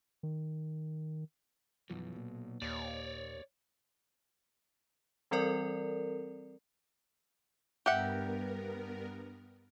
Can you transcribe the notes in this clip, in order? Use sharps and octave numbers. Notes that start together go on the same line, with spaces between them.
D#3
B1 F#2 E3 F3
A#2
D#2 C#5 D5
E3 G3 C4 A4 A#4 D5
G2 B3 G4 A#4 E5 F#5